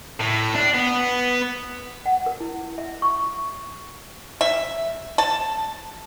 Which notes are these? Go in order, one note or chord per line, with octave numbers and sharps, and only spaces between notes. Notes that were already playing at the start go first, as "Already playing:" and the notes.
A2
D4
B3
F#5
A#4
E4
E5
C#6
E5
A5